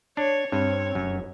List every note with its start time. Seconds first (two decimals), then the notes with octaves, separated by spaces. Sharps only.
0.17 D4 C#5
0.52 G2 C4 C#5
0.95 F1 F#2